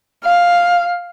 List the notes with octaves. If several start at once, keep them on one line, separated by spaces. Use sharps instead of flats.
F5